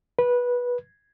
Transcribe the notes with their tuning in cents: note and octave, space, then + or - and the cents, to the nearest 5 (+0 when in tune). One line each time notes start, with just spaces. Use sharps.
B4 -15